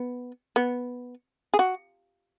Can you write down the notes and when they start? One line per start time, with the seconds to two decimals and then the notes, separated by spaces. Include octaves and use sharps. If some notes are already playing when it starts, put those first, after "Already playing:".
Already playing: B3
0.56 B3
1.54 G#4
1.59 F#4